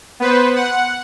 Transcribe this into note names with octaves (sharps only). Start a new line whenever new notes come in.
B3 B4 C5
F#5